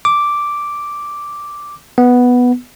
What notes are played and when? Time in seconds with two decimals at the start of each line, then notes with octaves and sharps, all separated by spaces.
0.05 D6
1.98 B3